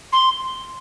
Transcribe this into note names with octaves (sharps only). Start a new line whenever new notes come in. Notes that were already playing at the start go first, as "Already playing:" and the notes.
C6